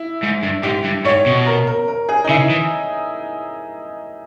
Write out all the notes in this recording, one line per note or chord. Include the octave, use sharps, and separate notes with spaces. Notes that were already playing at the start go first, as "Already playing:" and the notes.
Already playing: E4
G#2
G2
G#2 G4
G2
G#2 C#5
B2
A#4
A#4
A#4
G#4
D#4
C#3 E4
E3